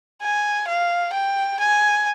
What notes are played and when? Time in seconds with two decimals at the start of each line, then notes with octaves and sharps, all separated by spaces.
0.21 G#5
0.67 F5
1.13 G5
1.59 G#5